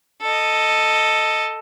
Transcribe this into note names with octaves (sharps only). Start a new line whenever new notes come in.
A4 D#5